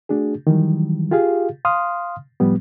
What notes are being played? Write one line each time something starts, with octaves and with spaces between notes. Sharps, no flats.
A3 D4 F#4 G#4
D#3 E3 F#3 G3
F4 G4 G#4 F5
F5 C6 D#6 F6
A2 F3 G3 B3